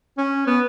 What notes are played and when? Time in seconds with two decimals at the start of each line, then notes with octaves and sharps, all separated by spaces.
0.18 C#4
0.47 B3